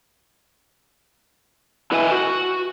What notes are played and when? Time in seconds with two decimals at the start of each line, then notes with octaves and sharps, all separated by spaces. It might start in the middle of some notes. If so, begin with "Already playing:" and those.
1.92 E4 B4 D#5 E5 G#5
2.12 F#4